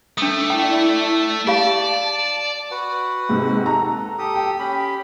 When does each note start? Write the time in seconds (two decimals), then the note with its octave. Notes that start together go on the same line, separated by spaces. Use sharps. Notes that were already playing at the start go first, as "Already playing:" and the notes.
0.18 A3 D4 D6 D#6
0.50 E4 D5 G5
0.87 A5
1.47 G4 D5 F5
2.71 F#4 B4 F#5
3.29 G#2 C3
3.66 A4 A#5
4.18 G4 A4 D#6
4.35 G5
4.59 C#4 G4 B5